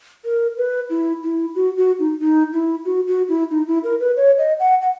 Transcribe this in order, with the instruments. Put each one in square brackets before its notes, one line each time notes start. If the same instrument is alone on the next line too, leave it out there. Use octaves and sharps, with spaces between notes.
[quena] A#4
B4
E4
E4
F#4
F#4
D#4
D#4
E4
F#4
F#4
E4
D#4
E4
A#4
B4
C#5
D#5
F#5
F#5